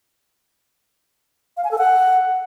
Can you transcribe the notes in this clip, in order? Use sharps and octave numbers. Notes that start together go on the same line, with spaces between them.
F5
G#5
A4
F#5